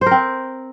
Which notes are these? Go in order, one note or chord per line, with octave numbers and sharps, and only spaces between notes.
C4 A#4 C5